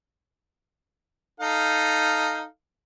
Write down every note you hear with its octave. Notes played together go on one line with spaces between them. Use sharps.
D#4 A4 F5